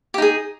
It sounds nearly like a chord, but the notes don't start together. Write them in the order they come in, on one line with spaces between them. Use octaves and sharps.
G4 D#4 G#4